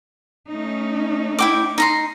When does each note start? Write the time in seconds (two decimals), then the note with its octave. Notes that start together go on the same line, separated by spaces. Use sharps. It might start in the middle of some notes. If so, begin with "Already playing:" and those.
0.49 A3 C#4 D#4
1.39 E4 G5 D6
1.78 D#4 A#5 C6